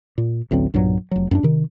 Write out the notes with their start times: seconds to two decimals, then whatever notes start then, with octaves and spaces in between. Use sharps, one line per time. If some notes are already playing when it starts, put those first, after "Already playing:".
0.18 A#2
0.51 A1 D2 F#3 C4
0.74 B1 G2 A#2 F#3
1.11 F1 F#3
1.31 F#2 C4 D4
1.43 C3 D#3